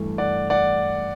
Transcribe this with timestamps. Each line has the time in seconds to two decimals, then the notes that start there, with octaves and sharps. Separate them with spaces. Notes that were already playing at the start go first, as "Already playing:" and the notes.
Already playing: G2 E3 A3
0.18 D5 F#5
0.50 D5 F#5